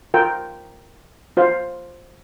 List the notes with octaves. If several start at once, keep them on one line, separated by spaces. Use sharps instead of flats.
F4 A#4 G5
F4 C5 F5